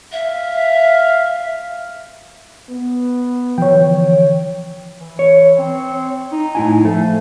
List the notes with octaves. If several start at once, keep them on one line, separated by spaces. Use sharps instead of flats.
E5 F5
B3
D3 E3 F3 C#5 G5
E3
C#5
C4
D#4
A2 E4 G#5
F3 A3